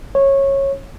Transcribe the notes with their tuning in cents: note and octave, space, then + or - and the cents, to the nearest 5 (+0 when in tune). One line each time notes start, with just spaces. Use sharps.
C#5 -15